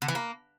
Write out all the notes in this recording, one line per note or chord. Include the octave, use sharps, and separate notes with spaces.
D3
E3
A#3